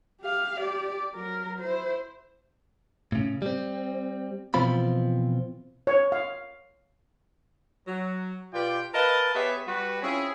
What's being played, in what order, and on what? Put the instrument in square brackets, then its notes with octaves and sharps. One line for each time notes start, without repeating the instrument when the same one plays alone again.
[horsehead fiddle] G4 F5
G4 D5
F#3 A#4
E4 C5
[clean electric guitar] A2 C#3
G3 C4
B2 E3 F3 C4 F4 B5
[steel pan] C#5
F5
[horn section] F#3
B2 F4 G4 B4 D5 G5
A#4 B4 D#5 F5 A5
B3 G4 G#4 B4 C#5 E5
G3 F#4 B4
C4 C#4 E4 F4 G#4